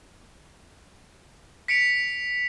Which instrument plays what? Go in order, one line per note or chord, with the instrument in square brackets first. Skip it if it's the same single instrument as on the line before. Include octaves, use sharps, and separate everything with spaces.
[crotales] B6 C#7 D7 F7